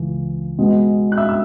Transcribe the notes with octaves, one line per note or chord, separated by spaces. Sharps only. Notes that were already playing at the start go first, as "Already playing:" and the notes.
Already playing: C#2 C#3 E3
B2 G#3 B3
F#6
E5 E6
E6